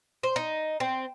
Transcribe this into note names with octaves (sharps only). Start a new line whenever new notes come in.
C5
D#4
C4